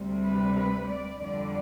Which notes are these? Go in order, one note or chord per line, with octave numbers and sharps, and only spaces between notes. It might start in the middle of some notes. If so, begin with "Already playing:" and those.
Already playing: D2 C3 G3
B4
B4
D5
F2 D3 G3 D5